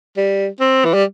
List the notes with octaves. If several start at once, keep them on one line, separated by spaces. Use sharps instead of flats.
G3
C4
E3
G3